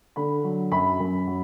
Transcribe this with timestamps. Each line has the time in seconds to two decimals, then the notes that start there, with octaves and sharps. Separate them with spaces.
0.16 D3 B5
0.44 F#3
0.72 F#2 B5
1.00 F#2
1.27 F#3